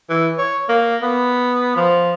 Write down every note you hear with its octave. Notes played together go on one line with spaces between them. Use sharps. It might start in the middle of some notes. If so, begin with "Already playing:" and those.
E3
C#5
A#3
B3
F3